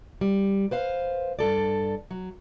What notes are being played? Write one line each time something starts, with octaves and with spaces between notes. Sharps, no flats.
G3
B4 C5 F5
G2 C3 A4 D5
F#3